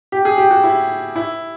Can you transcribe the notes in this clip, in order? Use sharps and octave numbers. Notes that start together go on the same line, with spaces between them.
G4
G#4
G4
F#4
E4
E4